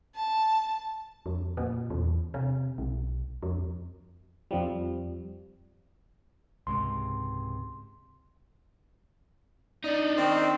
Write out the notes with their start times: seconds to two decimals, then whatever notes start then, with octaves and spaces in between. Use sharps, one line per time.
0.15 A5
1.26 F2
1.57 A#2
1.90 E2
2.34 C3
2.78 B1
3.43 F2
4.51 F2 F3 G3
6.67 C#2 G#2 C3 C6
9.84 D4 D#4 D5
10.17 D#3 C4